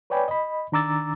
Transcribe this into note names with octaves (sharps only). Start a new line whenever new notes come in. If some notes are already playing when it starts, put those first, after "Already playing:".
B4 C#5 D5 G5 G#5 B5
D#5 B5
D#3 D4 A#5 D6 E6 A6